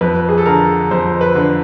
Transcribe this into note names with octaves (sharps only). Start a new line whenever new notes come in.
F2 B4
G#4
A4
D3 A#4
F2 C5
B4
D3